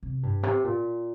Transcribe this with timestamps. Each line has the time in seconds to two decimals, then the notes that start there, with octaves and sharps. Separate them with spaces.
0.03 C3
0.23 G2
0.43 C3
0.64 A#2